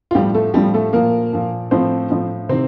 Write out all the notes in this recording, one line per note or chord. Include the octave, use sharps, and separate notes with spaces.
F4
A2 F3 G3 G4
A3 A4
A2 F3 G3 G4
A3 A4
A#2 F3 A#3 A#4
A#2 F3
A2 F3 C4 C5
A2 F3
C3 D#3 C4 C5